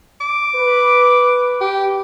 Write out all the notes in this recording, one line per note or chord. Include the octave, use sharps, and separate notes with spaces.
D6
B4
G4